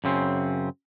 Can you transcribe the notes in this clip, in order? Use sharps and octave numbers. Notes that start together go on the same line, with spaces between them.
F#2 C#3 C4